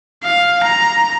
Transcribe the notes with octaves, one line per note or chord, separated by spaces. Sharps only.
F5
A#5